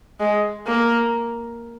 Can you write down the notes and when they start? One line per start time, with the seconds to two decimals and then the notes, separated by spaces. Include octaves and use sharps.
0.20 G#3
0.67 A#3